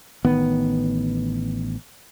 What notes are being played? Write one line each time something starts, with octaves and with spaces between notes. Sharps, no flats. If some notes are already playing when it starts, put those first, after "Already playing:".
A1 D#3 B3